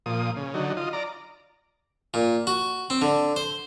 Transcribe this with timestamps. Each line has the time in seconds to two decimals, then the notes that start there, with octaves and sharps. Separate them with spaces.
0.06 A#2 F3 D#6
0.37 C#3
0.54 D3 F#3 D#4
0.77 F4 D#5
0.93 D5 A#5
2.14 A#2
2.47 F#4
2.90 C4
3.02 D3
3.36 C5